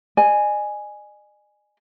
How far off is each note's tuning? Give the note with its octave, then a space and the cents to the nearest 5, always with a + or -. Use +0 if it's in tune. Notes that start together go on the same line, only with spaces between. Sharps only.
D#5 -45 G#5 +0